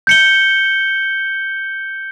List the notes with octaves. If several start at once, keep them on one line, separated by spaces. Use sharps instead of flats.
G6 C#7 G7